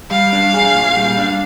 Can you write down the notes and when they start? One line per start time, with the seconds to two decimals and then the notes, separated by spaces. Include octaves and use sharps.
0.11 G3 F5
0.32 D4
0.54 G#4
0.74 A#2
0.96 G3
1.18 D4